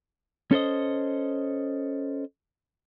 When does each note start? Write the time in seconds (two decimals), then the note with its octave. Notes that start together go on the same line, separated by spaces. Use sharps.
0.51 C#4 A4 C5 D#5